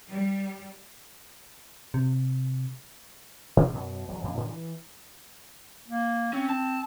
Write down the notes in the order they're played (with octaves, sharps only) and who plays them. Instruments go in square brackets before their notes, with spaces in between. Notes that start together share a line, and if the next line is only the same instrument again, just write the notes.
[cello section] G3
[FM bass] C3
[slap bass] B2 D3 D#3 G#3
F#2 B2
E1 F#3
F2 A#2 D3
A2 D3 D#3 G3
E3
[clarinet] A#3
[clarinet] C4 [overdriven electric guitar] C#4
[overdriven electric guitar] A5